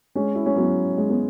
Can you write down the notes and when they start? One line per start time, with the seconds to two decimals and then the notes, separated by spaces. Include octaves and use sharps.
0.15 G#3 C#4
0.35 E4
0.46 C#4
0.56 F#3 B3
0.98 G#3
1.10 B3